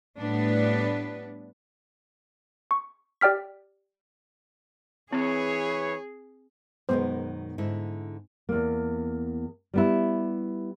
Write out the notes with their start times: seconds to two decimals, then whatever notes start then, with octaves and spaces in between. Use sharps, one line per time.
0.18 A2 G3 B3 D4 B4
2.71 C#6
3.21 G4 D5 G5 F6 B6
5.13 E3 C4 G#4 B4 C#5
6.89 F#2 B2 D#3 G#3 B3 C5
7.58 G#2 D3 E4
8.49 E2 A#3
9.74 G3 B3 E4